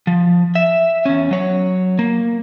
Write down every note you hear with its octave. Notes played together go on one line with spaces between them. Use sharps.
F3
E5
E2 C#4
F#3 C#5
A#3